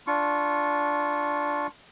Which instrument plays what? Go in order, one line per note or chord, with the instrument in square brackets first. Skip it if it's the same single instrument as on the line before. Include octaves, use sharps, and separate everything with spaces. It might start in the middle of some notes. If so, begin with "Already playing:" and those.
[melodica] D4 F4 C#6